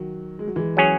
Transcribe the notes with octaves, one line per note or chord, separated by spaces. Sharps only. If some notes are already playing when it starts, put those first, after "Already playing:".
Already playing: D#3 F#3
G#3
F#3
E3 G#3
F#3 C#4 G#4 C#5